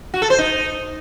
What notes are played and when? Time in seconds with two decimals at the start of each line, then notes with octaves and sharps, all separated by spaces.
0.14 F#4
0.22 A4
0.30 C5
0.38 D#4